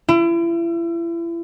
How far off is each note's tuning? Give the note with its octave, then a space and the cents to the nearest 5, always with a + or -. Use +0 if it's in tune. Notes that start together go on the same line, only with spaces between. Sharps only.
E4 +35